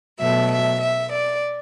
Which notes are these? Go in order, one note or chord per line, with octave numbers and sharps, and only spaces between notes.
B2 F#3 A3 E5
E5
E5
D5